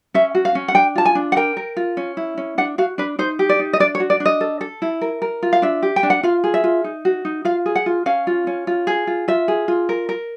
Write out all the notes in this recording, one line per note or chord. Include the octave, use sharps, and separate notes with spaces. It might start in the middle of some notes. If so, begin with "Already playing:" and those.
C#4 E5
F#4
F5
C#4
F#5
D4 G5
F4 A5
G#5
D4
F#5
A#4 G5
A#4
F4
C#4
E4
C#4
D4 F#5
F#4 F5
D4 B4
D#4 C5
G4
D5
D#4
D#5
D4 D5
C#5
F#4
D5
D4
D#5
A4
A4
E4
A#4
A#4
F4
F5
D4 E5
G4
G5
D4
F#5
F4 F5
G#4
E5
F4
D#4
F#4
D#4
F4 F5
G#4
F#5
F4
C#4 F5
F4
C#4
F4
G#4
F4
F4 E5
G#4
F4
A#4
A#4